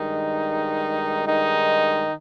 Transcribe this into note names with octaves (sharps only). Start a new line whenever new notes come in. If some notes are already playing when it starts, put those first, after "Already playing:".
Already playing: G2 D#3 G#3 D#4
D#3 D#4